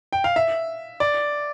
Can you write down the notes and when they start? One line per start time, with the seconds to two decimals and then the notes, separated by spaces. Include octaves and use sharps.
0.13 G5
0.24 F5
0.36 E5
1.00 D5